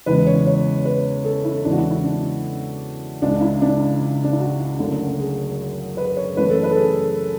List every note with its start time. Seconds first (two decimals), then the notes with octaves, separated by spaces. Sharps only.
0.06 E2 C#3 E3 G#3 B4
0.27 C#5
0.47 C#5
0.85 B4
1.25 A4
1.44 E4
1.65 E2 C#3 E3 G#3 D4
1.72 F#4
1.78 E4
1.90 E4
2.04 D4
3.22 C#2 C#3 G#3 D4
3.41 E4
3.62 D4
4.24 D4
4.32 E4
4.40 F#4
4.79 F#1 F#2 D3 A3
5.19 G#4
5.97 B4
6.17 C#5
6.37 F#2 E3 A3 B4
6.50 A4
6.63 B4
6.71 A4
6.77 G#4